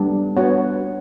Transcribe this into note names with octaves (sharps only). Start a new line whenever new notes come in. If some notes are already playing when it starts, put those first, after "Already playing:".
Already playing: G3 B3 D4
B3 F#4 C#5 F#5